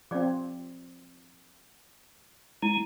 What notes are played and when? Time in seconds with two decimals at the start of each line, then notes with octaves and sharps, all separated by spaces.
0.11 F3 C4 D5 D6
2.62 G#3 E4